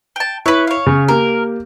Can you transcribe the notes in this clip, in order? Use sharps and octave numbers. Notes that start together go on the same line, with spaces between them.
G5 A5
E4 B4 C#5
C#5 F5
C#3
A#3 G4 A#4